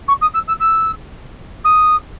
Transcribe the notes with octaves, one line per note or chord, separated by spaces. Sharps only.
C#6
D#6
E6
E6
E6
D#6